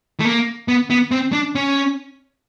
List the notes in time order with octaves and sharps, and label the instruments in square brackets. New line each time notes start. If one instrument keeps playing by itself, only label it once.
[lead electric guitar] A3
A#3
B3
B3
C4
D4
C#4